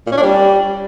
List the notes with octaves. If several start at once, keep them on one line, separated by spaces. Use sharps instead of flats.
A#2
C#4
D4
G3